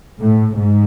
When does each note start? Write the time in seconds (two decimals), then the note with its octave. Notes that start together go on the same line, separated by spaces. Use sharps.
0.20 A2
0.55 G#2